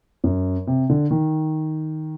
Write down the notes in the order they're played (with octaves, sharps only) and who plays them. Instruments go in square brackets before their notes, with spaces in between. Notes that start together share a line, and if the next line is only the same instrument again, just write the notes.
[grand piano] F#2
C3
D3
D#3